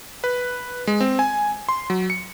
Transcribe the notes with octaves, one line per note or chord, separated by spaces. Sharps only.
B4
G#3
C4
G#5
C6
F#3
C#7